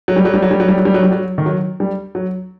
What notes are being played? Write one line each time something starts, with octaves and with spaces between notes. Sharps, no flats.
F#3
G3
F#3
G3
F#3
G3
F#3
G3
F#3
G3
F#3
G3
F#3
D#3
F#3
G3
F#3